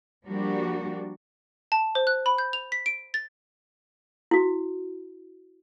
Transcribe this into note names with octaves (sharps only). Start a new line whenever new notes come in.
F3 G3 A#3 D4 F#4 G4
A5
C5
F#6
B5
G6
F7
B6
D7
A6
E4 F#4